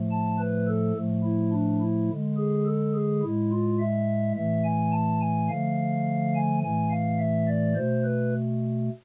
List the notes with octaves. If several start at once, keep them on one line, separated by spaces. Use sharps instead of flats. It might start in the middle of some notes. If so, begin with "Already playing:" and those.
Already playing: A2 F3 A3
A5
B4
A4
A2 F3 A3
E4
D4
E4
D3 G#3
G#4
A4
G#4
A2 G#3 E4
F4
E5
A2 E3 A3 E5
G#5
A5
G#5
D3 F3 A3 F5
G#5
A2 E3 A3 G#5
F5
E5
D5
B2 A3 C5
B4